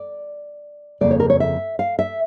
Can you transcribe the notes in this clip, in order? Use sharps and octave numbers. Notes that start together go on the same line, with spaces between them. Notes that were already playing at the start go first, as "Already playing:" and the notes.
Already playing: D5
F2 C#3 F3 A#3 D5
C#5
A#4
C#5
E5
F5
E5